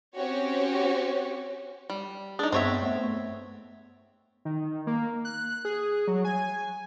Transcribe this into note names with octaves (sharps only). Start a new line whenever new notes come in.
C4 C#4 F#4 G4 C#5
G3
D4 D#4 G#4
G2 B3 C4 C#5 E5
A3 B3
D#3
A#3
F#6
G#4
F#3
G#5